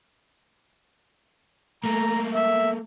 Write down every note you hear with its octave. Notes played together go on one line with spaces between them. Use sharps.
A3 A#3 A#5
E5